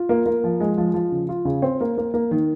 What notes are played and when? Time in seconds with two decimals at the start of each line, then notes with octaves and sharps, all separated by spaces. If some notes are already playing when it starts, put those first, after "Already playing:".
Already playing: F4
0.09 A#3
0.26 A#3
0.44 F3
0.60 G#3
0.78 F3
0.94 F3
1.12 C#3
1.29 F4
1.45 C#3
1.62 C4
1.81 A#3
1.97 A#3
2.14 A#3
2.31 D#3